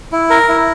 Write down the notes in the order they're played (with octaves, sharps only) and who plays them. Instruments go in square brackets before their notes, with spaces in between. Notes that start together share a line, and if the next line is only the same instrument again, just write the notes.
[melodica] E4
A#4
E4